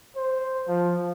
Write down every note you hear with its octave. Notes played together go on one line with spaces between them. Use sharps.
C5
F3